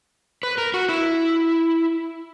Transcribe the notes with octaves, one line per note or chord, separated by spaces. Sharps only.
B4
A#4
F#4
E4